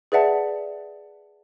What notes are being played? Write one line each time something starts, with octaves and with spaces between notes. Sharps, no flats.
G#4 B4 D5 E5 F#5 A5